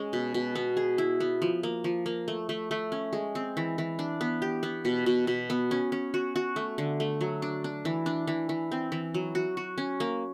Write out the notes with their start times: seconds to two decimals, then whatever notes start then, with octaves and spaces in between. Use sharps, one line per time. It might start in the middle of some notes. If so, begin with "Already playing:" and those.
Already playing: G#3 C#4
0.13 B2
0.34 B2
0.55 B3
0.77 G#4
0.98 E4
1.20 B3
1.42 F3
1.63 A#3
1.84 F3
2.06 A#3
2.28 A3
2.49 A3
2.71 A3
2.92 C#4
3.13 G#3
3.35 C4
3.57 E3
3.78 E3
3.99 D4
4.21 B3
4.42 G4
4.63 B3
4.85 B2
5.06 B2
5.27 B2
5.50 B3
5.71 C#4
5.92 C#4
6.14 F#4
6.36 F#4
6.56 A3
6.78 D3
7.00 A3
7.21 F#3
7.42 D4
7.64 D4
7.85 E3
8.06 D4
8.27 E3
8.49 E3
8.72 C4
8.92 E3
9.14 F#3
9.35 F#4
9.57 F#4
9.78 C#4
10.00 A#3